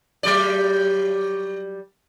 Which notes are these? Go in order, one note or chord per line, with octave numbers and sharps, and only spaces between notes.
F#3 G3 D5